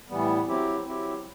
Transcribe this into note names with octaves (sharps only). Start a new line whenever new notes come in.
A2 E3 G3 B3
F#3 C4 E4 G4
F#3 C4 E4 G4